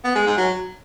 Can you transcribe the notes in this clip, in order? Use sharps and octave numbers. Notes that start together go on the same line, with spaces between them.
B3
G#3
G#2
F#3